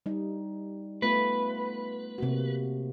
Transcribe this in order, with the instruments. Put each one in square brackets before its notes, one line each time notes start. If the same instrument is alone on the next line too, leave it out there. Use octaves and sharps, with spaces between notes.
[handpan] G3 D#4
[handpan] A3 B3 F4 [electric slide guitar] B4
[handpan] C3 A#3 F#4